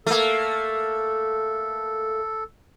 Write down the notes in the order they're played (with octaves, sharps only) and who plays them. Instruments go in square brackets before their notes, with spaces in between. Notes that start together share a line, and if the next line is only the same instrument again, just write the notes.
[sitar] A3 A#3 [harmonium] A4